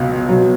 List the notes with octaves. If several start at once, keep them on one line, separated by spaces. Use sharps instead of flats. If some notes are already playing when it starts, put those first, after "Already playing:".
Already playing: C#2 B2 F#3
B2 F#3